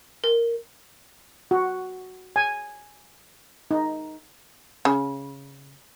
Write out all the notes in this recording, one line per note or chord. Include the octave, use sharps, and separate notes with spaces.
A#4
F#4
G#5
D#4
C#3